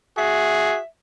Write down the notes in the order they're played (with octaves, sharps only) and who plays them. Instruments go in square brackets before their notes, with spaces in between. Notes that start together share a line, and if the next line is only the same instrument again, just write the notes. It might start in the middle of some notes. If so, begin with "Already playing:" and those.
[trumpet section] F#4 G#4 [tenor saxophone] E5